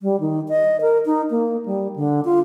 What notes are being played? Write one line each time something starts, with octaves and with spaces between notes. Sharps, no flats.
G3
D#3
D#5
A#4
D#4
A#3
G3
D3
F4